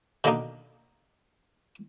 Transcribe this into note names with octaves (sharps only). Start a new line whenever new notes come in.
B2 D3 D#3 A#3 D4 D#4